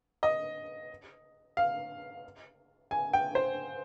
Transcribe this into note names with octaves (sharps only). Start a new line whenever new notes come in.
D#5
F5
G#5
G5
C5